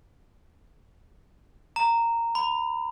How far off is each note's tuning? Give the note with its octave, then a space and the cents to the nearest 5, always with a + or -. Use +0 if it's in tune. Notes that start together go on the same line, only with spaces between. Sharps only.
A#5 -10
B5 +20